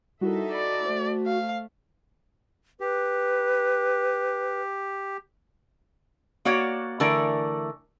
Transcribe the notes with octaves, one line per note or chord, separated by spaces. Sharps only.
G3 D#4 E4 F#4 A4 A#4 E5
D5 B5 A#6
A3 C5
F5
G4 B4
A#3 F#4 C#5 D5
D3 E3 A3 A#4 D5